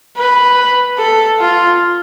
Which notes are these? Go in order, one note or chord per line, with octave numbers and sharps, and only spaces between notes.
B4
A4
F4